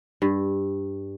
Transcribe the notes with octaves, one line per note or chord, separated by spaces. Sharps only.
G2